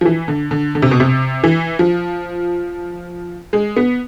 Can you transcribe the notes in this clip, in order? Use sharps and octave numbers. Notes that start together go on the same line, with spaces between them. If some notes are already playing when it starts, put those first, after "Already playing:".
F3
E3
D3
D3
D3
C3
B2
C3
E3
F3
G#3
B3